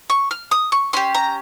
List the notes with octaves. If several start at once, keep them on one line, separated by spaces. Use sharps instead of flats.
C#6
F6
D#6
C#6
C#4 G4 C6
A#5